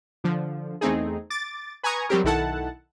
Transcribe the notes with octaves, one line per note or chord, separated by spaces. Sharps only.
D3 F3
E2 A3 C4 D#4 G#4
D6 A6
B4 G#5 A#5 C#6 D#6 G#6
F#3 G3 C4 G4 A#4
B1 D#3 E4 A4 F#5 A5